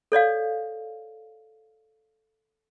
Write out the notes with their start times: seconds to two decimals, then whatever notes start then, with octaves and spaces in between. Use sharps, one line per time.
0.12 A4 C#5 D5 F5